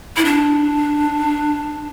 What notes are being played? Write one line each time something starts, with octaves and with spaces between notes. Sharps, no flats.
E4
D4